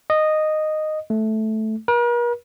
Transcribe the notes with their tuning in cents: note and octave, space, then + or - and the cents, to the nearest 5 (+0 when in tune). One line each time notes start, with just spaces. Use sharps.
D#5 -10
A3 -10
A#4 +45